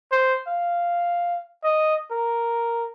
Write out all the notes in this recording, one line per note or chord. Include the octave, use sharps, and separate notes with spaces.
C5
F5
D#5
A#4